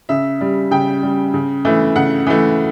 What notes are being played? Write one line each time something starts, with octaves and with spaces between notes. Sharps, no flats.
C#3 E5
G3
C#3 G5
G3
C#3
E3 A3
C#3 F#5
E3 A3